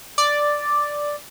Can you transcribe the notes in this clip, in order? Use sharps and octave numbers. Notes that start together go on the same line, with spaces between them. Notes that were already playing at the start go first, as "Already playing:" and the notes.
D5